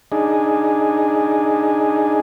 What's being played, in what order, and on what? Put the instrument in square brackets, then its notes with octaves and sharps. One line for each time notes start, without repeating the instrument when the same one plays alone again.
[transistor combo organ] D4 D#4 G#4